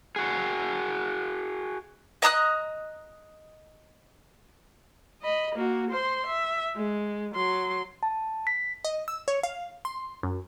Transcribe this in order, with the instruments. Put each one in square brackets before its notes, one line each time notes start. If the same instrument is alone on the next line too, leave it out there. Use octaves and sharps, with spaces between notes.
[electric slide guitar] F#4 G#4
[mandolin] D#5 A#5 D#6 F#6
[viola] D#5 B5
A#3 F#4
C5 C6
E5
G#3
F#3 C6
[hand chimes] A5
B6
[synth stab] D#5
E6
C#5
F5
C6
F#2